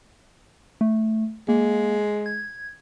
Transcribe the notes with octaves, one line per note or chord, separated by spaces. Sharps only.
A3
G#3 A#3
G#6